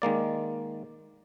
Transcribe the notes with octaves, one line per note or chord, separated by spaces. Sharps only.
D#3 G#3 A#3 D5